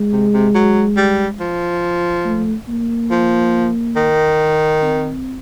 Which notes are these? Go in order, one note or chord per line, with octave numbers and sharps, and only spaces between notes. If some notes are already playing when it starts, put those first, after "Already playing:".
Already playing: G#3
C3
C3
F#3
G3
F3
A3
A#3
F3
D#3
C4